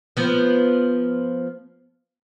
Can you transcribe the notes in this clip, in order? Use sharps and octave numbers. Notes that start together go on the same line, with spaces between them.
F3 B3